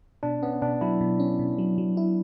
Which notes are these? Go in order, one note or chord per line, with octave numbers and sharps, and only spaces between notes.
B2 D4
B3 C#4
B2 D4
F#3 E4
B2
C#4
B2
F#3
F#3
E4